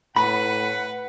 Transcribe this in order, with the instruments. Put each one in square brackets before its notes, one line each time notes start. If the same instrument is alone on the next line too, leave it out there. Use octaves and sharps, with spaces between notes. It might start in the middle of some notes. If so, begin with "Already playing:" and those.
[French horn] A2 [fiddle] B4 [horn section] F#5 [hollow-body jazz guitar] B5